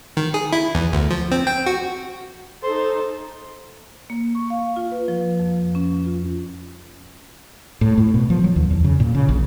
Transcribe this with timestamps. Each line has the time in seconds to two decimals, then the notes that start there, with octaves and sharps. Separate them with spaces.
0.17 D#3
0.34 G#4
0.53 E4
0.75 E2
0.93 D2
1.11 F3
1.32 C4
1.47 G5
1.66 F#4
2.64 D#4 A4 C5
4.10 A#3
4.35 C#6
4.50 F5
4.76 F4
4.92 B4
5.08 F3
5.39 F2
5.75 C#4
6.06 F4
7.81 A2
7.98 A2
8.14 B2
8.30 F3
8.44 F#3
8.56 D#2
8.71 E2
8.84 C#3
9.00 A#2
9.15 C#3
9.29 A#1